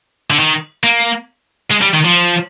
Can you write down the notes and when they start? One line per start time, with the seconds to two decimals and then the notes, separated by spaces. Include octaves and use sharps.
0.30 D3
0.39 D#3
0.84 A#3
1.71 G#3
1.82 G3
1.94 D#3
2.05 F3